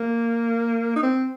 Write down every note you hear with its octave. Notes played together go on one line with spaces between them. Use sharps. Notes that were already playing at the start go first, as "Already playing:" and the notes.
Already playing: A#3
D#4
C4